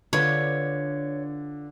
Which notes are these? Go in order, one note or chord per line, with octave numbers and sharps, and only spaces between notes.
D3 D4 F4 B4 C#5